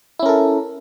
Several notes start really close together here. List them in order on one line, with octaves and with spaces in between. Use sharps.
E4 C#4 A#4 A4